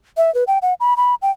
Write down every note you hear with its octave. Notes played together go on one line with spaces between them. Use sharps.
E5
B4
G5
F#5
B5
B5
G5